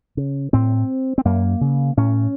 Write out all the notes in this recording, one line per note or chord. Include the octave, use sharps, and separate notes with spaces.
C#3
A2 C4
C4
F#2 A#3
C#3
A2 C#4